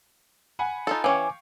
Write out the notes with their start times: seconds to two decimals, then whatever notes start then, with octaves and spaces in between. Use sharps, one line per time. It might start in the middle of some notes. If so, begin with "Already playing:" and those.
0.59 F#5 G#5 B5
0.87 D#4 F4 A4
1.04 E3 C#4 F5 G5 G#5 C#6 D6